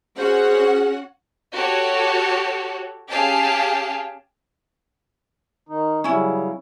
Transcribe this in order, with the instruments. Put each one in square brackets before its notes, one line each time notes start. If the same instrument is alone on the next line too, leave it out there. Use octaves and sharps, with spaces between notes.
[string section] C#4 F#4 F#5 [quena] G#4 [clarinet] C5
[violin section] F#4 G4 A4 C#5
C#4 G4 G#4 F5 G5 A5
[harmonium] D#3 D#4
[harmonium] C#3 F#3 G3 [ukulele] C#4 E4